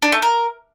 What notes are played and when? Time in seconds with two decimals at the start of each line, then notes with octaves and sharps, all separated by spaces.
0.02 D4
0.12 A3
0.22 A#4